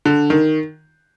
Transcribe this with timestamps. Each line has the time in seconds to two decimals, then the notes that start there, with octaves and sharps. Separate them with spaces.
0.05 D3
0.30 D#3